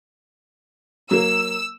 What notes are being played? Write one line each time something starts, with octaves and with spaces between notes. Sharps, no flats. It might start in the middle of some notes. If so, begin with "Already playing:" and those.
F#3 A#3 E6